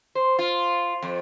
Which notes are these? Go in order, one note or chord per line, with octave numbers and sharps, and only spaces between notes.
C5
F4
F2